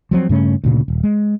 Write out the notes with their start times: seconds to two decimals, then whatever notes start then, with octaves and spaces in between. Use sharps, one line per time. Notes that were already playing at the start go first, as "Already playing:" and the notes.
0.11 F3 F#3 B3 C4
0.29 G2 C#3 A3 C#4
0.64 D2 A#2 C#3
0.88 D#1
1.04 G#3